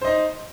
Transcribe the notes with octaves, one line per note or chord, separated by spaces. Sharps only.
D#4 C5 D#5